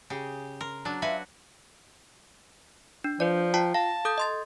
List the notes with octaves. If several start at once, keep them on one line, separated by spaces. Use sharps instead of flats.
C#3 G4 G#4
A#4 C6
F#3 D4
F4 F#4 B4 E5 G#5
D4
F3 B4 D5
F4 G5 A5
F5 A5
A4 D#6 G6
D#5 C6 A6